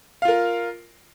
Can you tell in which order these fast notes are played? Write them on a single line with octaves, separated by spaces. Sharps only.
F5 F4 A#4